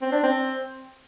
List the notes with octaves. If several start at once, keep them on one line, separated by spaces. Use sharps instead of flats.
C4
D4
C4